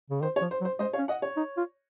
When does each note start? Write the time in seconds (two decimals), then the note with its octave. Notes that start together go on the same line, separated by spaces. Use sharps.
0.10 C#3
0.21 D#3 C5
0.36 C#5
0.42 F3
0.51 C5
0.61 F#3
0.65 C5
0.79 G#3 C5 D#5
0.93 C#5 F5
0.99 C#4
1.08 D#5 F#5
1.22 C#5
1.37 D#4
1.57 F4